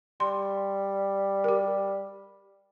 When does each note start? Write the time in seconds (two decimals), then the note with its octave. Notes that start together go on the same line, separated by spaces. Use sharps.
0.20 G3 C6
1.44 G4 A#4